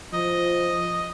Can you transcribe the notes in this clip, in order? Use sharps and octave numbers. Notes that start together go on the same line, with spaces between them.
F3 D#5